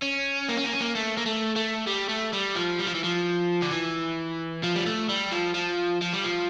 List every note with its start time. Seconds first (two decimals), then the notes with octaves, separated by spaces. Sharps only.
0.02 C#4
0.49 A#3
0.57 C#4
0.64 A#3
0.73 C#4
0.80 A#3
0.95 A3
1.17 A#3
1.26 A3
1.56 A3
1.87 G3
2.09 A3
2.33 G3
2.55 F3
2.79 G3
2.87 F3
2.95 E3
3.04 F3
3.62 D3
3.71 E3
4.63 F3
4.76 G3
4.86 A3
5.09 G3
5.32 F3
5.55 F3
6.01 F3
6.13 G3
6.24 F3